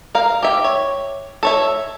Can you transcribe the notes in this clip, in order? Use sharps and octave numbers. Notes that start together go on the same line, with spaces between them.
A#4 F5
G4 E5
C#5
A4 C#5 E5